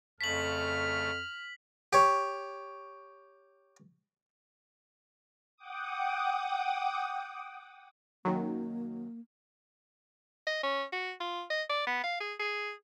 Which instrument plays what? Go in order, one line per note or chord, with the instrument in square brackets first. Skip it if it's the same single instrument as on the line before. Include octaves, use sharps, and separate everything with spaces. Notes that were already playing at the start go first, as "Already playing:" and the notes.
[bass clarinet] F2 [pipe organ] C#3 A3 A5 [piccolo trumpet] F6 [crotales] B6 F#7
[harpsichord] G4 C#5
[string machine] F#5 G5 D6 D#6
[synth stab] F#2 D#3 F#3 [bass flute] A#3
[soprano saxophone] D#5
C#4
F#4
F4
D#5
D5
B3
F5
G#4
G#4